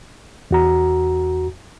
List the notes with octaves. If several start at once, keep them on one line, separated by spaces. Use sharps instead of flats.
E2 F#4 A#5